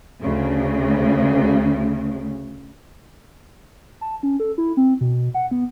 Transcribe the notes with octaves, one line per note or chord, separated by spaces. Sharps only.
D2 C#3
A5
C#4
A4
E4
C4
B2
F#5
B3